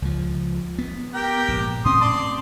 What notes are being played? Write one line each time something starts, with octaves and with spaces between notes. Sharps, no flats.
C#2 F3
B3
G4 A#4 G5
A#1 G#2
A2 C4 C#4 C6 D#6
D5 A5 C6